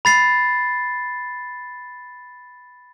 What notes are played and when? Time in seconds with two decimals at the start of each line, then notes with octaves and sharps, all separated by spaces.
0.05 B5 A6 C7